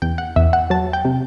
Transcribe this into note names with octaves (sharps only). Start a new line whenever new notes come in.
E2 G5
F#5
E2 E5
F#5
F#3 A5
G5
C3